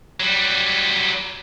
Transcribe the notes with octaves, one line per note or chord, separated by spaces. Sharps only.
F#3 G3